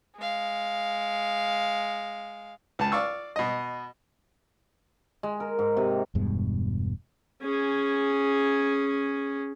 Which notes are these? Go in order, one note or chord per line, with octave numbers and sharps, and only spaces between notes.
G#3 F5
C#2 A5
D5 F5 C#6 E6
B2 D#5
G#3
A#4
G#2
C3
E1 G2 B2 G#3
C#4 G#4